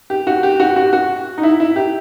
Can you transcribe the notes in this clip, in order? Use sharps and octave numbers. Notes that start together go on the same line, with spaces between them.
G4
F#4
G4
F#4
F#4
F#4
D#4
E4
E4
G4